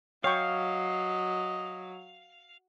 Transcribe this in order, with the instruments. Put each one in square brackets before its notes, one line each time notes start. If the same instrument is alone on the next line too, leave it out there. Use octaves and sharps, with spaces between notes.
[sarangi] F#3 [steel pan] C#5 G5 C#6 [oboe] D#5 [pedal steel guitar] F5